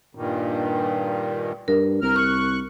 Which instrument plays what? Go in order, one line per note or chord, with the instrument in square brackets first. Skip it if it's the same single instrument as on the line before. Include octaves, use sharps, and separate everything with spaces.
[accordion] G2 A#2 D#3
[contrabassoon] G2 [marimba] A#4
[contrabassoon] C2 [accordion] A#4 F6
[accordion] C#6 F#6 [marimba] F6